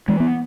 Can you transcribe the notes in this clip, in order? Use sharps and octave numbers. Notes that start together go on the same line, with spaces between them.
E3 G#3
B3